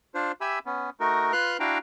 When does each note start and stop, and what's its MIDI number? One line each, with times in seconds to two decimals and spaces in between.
0.15 0.32 62
0.15 0.32 65
0.15 0.32 72
0.41 0.59 67
0.41 0.59 76
0.41 0.59 80
0.41 0.59 83
0.41 0.59 88
0.66 0.90 59
0.66 0.90 61
1.00 1.32 57
1.00 1.32 63
1.00 1.32 66
1.00 1.32 70
1.32 1.57 65
1.32 1.57 71
1.32 1.57 84
1.32 1.57 89
1.32 1.57 90
1.60 1.78 62
1.60 1.78 64
1.60 1.78 66
1.60 1.78 77
1.60 1.78 79
1.60 1.78 82